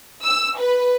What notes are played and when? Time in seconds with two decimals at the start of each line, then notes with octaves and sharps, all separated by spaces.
0.25 E6
0.58 B4